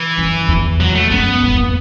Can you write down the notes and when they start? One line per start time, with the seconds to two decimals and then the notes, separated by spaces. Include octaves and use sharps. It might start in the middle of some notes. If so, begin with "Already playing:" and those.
Already playing: E3
0.18 F#2
0.48 E2
0.80 F#3
0.95 A3
1.11 F#2 B3
1.43 G#2
1.53 E2